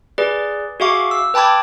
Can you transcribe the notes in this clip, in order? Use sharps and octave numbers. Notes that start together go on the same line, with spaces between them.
G#4 B4 D5
F#4 G#4 E5 F5 C#6 D6
E6
B4 G5 A5 B5 D6 G#6